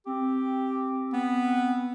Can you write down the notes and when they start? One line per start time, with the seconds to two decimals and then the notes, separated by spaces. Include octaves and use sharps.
0.06 C4 G4
1.13 B3